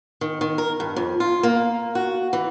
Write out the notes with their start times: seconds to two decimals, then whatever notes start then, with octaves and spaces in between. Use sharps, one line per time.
0.21 D#3
0.41 D#3
0.58 A#4
0.80 G2
0.96 F2
1.20 F4
1.43 A#3
1.95 F#4
2.33 E3